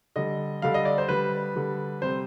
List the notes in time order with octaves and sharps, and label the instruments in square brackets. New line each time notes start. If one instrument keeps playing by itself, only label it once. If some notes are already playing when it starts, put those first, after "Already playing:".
[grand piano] D3 G3 D#5
D3 G3 F5
D#5
D5
C5
D3 G3 B4
D3 G3
C3 G3 C5